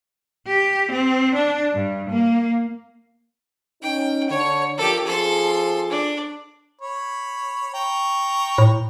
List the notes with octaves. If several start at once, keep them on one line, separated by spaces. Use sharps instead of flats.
G4
C4
D4
G2
A#3
C#4 D#4 G5
D3 C#5
F3 D4 G4 A4 A#4
F3 C4 G#4 A4 C6
D4
C#5 B5
G5 A#5 C#6
A2